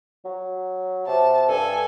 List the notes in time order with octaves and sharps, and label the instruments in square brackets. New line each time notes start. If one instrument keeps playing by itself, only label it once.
[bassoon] F#3
[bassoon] C3 [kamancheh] A5
[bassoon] G2 [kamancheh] A4 G#5